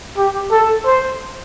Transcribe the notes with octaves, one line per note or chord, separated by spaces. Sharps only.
G4
A4
C5